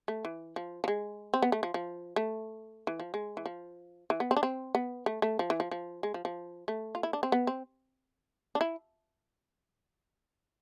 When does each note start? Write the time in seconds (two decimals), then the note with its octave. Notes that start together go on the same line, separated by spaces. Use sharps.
0.08 A3
0.25 E3
0.56 F3
0.84 F3
0.88 G#3
1.34 C4
1.42 B3
1.52 A3
1.63 F3
1.74 F3
2.16 A3
2.87 E3
3.00 F3
3.14 G#3
3.37 E3
3.46 F3
4.10 E3
4.20 B3
4.31 C4
4.37 D4
4.43 C4
4.75 B3
5.06 A3
5.22 A3
5.39 F3
5.50 E3
5.60 F3
5.71 F3
6.03 G#3
6.14 F3
6.25 F3
6.68 A3
6.95 F4
7.03 E4
7.13 D4
7.23 C4
7.32 B3
7.47 C4
8.55 D4
8.61 E4